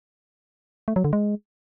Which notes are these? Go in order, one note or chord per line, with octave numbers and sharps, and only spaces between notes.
A3
F#3
D3
G#3